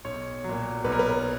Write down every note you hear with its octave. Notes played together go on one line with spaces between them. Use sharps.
B1 C#5
A#2 F#3
B1 B4
A#4
B4